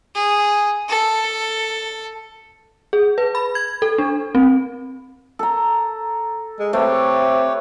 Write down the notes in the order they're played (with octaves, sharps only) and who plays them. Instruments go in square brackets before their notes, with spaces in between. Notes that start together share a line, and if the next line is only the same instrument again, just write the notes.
[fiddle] G#4
A4
[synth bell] G#4
B4
B5
G#6
A4
D4
C4
[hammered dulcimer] A4 A#5
[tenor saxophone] G#3
[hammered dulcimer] A3 [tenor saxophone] C4 [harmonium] G4 B4 C#5